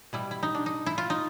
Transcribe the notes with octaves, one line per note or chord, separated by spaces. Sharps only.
B2 G3 E4
E4
D#4
D4
D#4
E4
F4
D#4